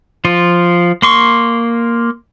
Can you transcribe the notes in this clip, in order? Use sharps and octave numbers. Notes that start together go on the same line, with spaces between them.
F3 F4
A#3 C6 C#6